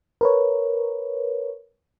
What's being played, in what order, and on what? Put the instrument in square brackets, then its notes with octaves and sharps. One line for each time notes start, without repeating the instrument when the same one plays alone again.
[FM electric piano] A#4 B4 C#5